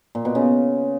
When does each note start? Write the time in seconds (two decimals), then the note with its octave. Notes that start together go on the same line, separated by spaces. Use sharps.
0.15 A#2
0.25 B2
0.35 C#3